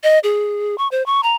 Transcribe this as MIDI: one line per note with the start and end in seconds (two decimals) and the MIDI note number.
0.03 0.19 75
0.24 0.76 68
0.78 0.88 85
0.91 1.05 72
1.06 1.21 85
1.23 1.36 82